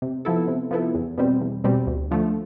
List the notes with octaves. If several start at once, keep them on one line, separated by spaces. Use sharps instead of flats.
C3
F3 B3 E4 A4
C3
F3 B3 E4 A4
E2
B2 G3 C4
E2
B2 G3 C4
D2
D3 F3 A3